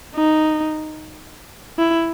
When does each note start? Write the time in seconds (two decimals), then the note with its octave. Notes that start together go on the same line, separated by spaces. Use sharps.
0.16 D#4
1.79 E4